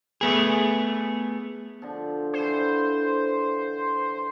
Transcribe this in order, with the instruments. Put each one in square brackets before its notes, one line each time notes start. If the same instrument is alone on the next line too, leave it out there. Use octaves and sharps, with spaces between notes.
[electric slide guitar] A3 B3 G#4
[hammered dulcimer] D3 F3
[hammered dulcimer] D3 E3 [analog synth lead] C5